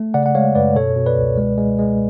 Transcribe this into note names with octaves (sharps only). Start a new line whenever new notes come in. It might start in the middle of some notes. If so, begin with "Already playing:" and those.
Already playing: A3
C#3 D5 F#5
F#5
G#3 C#5 F5
F#2 B4 D5
B2 A4 C#5
B2
B4 D5
C#2
G#3
G#3
G#3